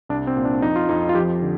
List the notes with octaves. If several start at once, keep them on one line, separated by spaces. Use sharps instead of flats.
C2 D4
C4
A#2
D4
F2 D#4
F4
F2 D#4
F4
F3 G4
D3